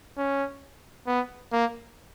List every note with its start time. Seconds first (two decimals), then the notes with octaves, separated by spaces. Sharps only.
0.18 C#4
1.07 B3
1.52 A#3